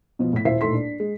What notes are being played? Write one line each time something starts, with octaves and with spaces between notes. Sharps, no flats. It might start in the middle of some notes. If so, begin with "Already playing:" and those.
B2 F3 B3
A2 B6
D#1 E4 C5 E5 B6 C7
D#1 A2 D#4 A4 C6 B6
D4
G#3